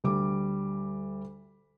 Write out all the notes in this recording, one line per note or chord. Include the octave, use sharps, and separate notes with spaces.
D2 G3 D6